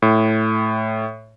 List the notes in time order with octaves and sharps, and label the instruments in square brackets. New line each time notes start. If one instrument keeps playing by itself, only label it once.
[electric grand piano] A2